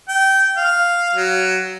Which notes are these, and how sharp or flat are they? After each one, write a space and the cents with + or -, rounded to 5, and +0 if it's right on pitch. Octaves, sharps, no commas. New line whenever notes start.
G5 -20
F5 +0
F#3 +15